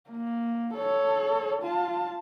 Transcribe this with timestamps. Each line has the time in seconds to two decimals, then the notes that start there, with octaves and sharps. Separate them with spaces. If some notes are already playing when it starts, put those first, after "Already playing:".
0.10 A#3
0.74 A4 C#5
1.62 F4 A5